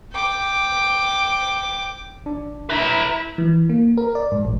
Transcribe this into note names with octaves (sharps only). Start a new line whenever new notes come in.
G5 D6
G#1 D4
E4 B4 E5 A#5
E3
A#3
A#4
D5
G#2
A1